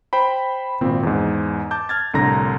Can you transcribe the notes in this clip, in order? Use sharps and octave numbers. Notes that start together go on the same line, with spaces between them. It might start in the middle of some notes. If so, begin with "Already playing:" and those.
C5 G5 B5
G#1 A#2 C4 B5
E2 G#2
A5 D6 G6
F6 G#6 A6
C2 A2 D3 A#5 A#6